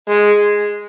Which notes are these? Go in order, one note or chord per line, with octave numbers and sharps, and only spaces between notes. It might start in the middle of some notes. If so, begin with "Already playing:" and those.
G#3